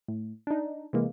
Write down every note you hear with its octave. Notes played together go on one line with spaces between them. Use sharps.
A2
D4 D#4
C3 E3 G#3 A#3